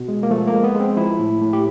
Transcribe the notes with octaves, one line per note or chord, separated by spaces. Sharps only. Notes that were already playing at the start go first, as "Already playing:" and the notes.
Already playing: B2
G#3
A#3
F3 A3
A#3
G#3
B3
G#3
C4
F3 E4
A2
A2
G4